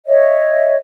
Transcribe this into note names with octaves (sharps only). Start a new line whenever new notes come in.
C#5 D#5 E5